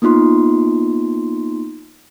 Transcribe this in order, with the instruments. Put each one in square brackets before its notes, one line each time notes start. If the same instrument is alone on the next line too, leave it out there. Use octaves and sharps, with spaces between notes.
[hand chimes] A#3 B3 D#4 F4 C6